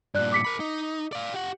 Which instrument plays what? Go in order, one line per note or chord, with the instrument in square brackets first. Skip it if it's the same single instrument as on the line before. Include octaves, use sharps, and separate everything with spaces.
[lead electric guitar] G2 A#2 [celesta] D5 F#6
[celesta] D6 B6 C#7
[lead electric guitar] A#4 B5
D#4
D5 F5
G4 F#5